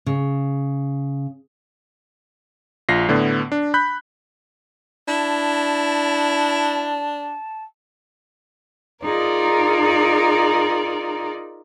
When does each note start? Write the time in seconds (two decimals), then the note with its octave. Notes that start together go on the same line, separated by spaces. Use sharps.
0.06 C#3
2.89 A#1 F4 A#6 C7
3.09 A2 D3 B3
3.52 D4
3.74 B5 F#6 G6 B6
5.08 D4 E4 A5
9.04 D#4 F4 G#4 A#4 D5